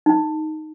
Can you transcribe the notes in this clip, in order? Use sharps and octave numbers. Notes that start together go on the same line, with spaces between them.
D#4